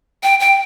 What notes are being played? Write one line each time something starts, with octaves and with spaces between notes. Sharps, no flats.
G5
G5